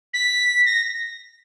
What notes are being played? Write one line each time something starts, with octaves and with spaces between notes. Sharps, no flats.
B6
A#6